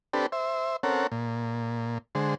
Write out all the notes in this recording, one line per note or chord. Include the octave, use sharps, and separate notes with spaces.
C4 D4 G4 A4 B4
C5 E5
C4 C#4 A4 A#4 F#5
A#2
D3 G#3 C5